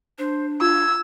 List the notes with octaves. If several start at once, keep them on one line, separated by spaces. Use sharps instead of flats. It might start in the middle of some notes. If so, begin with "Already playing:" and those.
D4 C5
F4 E6 G#6